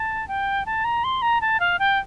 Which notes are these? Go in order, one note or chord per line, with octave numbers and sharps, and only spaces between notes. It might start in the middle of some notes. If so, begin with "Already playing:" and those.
Already playing: A5
G5
A5
A#5
C6
A#5
A5
F5
G5